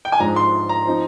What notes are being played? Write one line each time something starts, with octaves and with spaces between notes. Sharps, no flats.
G5
G#5
G#2 F3 G#3 D4 A#5
C6
A#5
F3 C4 D#4